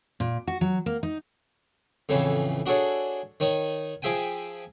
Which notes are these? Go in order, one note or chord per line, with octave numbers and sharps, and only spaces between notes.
A#2
F#4
F#3
A#3
D#4
F2 A2 C#3 E3
D4 F#4 G#4 A4 C#5
D#3 C#5 D#6
F3 G#4 E5 G5 G#5